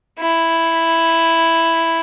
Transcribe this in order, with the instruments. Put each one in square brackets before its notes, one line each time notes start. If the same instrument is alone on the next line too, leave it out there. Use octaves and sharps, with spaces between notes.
[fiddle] E4